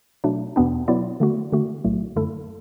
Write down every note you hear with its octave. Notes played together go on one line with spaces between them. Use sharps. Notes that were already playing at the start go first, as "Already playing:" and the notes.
B2 F#3 A3 D4
E2 B2 B3 D4
B2 F#3 B3 E4 D5
D3 A3 F#4
D3 A3 F#4
B1 A2 F#3 A3
F#2 D3 A3 E4 A4